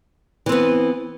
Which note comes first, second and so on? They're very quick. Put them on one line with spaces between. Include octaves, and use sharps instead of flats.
E3 C4 B3